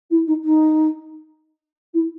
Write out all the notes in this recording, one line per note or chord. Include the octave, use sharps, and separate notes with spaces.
E4
D#4
D#4
E4